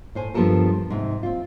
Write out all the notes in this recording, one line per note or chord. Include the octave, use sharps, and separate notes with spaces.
A2 C5 G#5
G2 F3 B3 G4 A4 A#4
G#2 C3
C4 F4